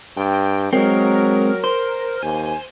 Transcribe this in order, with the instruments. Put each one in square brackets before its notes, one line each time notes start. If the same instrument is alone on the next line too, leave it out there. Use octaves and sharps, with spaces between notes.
[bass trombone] G2 [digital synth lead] G5
[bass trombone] F#3 [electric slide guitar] G#3 C4 [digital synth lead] A#4
[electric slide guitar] C5
[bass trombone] D#2 [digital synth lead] G#5